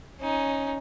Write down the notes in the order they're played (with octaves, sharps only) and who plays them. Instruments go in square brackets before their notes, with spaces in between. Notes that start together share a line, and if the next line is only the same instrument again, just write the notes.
[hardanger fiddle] C#4 D#4